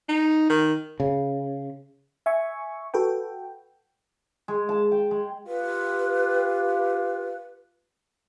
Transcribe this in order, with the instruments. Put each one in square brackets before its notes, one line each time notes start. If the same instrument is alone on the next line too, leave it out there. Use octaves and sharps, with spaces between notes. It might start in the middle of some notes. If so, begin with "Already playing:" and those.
[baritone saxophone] D#4
D#3
[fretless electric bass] C#3
[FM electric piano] E5 G#5 C#6
F#4 A4 B4 G5
[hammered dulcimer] G#3
A5
G5
G#3
[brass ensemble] F4 G4 [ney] B4